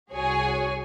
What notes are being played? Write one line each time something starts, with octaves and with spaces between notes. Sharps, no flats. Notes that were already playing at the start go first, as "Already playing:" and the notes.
C2 F#4 G#4 C#5 G#5